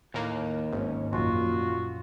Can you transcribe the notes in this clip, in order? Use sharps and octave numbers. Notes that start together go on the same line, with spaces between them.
D#2 A2 A#3
G#1 G#2 C#4
A#1 F#2 A#2 F4 F#4